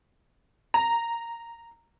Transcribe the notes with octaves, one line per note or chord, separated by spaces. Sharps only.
A#5